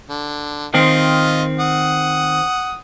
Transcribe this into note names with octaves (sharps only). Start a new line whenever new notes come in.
D3
D#3 C4 F4 D#5
F#5 D#6